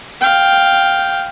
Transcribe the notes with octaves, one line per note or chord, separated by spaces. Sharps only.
F5 G5